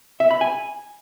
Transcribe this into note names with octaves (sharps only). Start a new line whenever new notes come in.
E5
B5
G#5